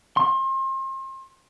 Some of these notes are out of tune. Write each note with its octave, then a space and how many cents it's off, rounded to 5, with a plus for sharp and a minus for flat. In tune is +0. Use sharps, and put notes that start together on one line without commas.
C6 +35